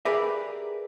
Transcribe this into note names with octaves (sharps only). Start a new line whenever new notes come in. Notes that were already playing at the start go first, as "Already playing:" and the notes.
G4 G#4 A#4 B4 D5 E5